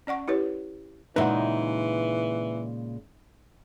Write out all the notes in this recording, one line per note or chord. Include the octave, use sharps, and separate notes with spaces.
C#4 D5 F#5 C#6
E4 G4 B4 C#5
A#2 C#3 E3 G#3 D#4 B4 E5 F#5